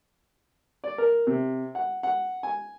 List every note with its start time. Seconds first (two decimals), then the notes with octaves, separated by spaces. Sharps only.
0.84 D5
0.98 A#4
1.27 C3
1.75 F#5
2.03 F#5
2.43 G#5